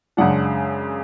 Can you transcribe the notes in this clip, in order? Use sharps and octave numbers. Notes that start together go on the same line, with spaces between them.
F#2 C#3 G#3 D4 F#5